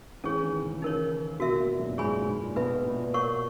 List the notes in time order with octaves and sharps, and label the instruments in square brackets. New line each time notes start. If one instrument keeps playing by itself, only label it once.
[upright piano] E3 [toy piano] C#4 G#4 C#5
[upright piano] D#3
C#3
[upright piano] E3 [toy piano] D#4 A#4 C#5
[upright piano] B2 [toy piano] F#4 A#4 E5
[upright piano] A#2
F#2
A#2
[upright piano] G#2 [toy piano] G#4 C#5 G#5 B5
[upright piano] G#2
A#2
[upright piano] B2 [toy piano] B4 E5 B5
[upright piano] A#2
[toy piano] A#4 C#5 F#5 C#6